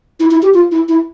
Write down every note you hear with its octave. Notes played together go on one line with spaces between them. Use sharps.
E4
E4
G4
F4
E4
E4